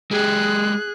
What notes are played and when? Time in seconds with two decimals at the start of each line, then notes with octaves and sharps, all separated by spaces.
0.11 G#3 G4 G#4 F#6